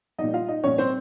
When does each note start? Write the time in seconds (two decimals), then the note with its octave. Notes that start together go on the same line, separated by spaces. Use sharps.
0.18 A#2 G3 D#4 D#5
0.33 F4 F5
0.48 D#4 D#5
0.64 A#2 G3 C#4 C#5
0.78 C4 C5